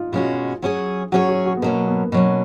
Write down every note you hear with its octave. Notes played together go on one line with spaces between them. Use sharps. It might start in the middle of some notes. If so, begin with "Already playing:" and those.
Already playing: D#4 F4
B2 G#3 C#4 F4 F#4
F#3 C#4 G#4 C#5
F#3 C#4 F#4 G#4 C#5
F#4
F#4
B3
B2 F#3 A#3 C#4
B3
B2 F#3 C#4